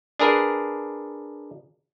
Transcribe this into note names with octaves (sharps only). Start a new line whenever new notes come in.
D4 G#4 A#4 B4